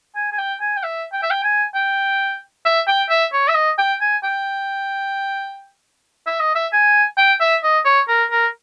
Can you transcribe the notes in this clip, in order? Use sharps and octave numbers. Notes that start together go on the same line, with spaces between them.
G#5
G#5
G5
G#5
G5
E5
G5
E5
G5
G#5
G5
E5
G5
E5
C#5
E5
D#5
G5
G#5
G5
E5
D#5
E5
G#5
G5
E5
D#5
C#5
A#4
A#4